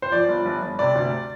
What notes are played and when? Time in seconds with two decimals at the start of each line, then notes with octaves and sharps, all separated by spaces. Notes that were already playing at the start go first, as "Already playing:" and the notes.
0.02 C5
0.12 F3 D5
0.29 G1
0.46 G1
0.62 G1
0.79 C3 D5
0.95 D2